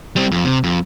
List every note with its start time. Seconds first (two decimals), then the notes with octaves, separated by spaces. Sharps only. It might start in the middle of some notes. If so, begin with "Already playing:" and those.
0.16 G3 C4
0.32 F2
0.44 C3
0.64 F2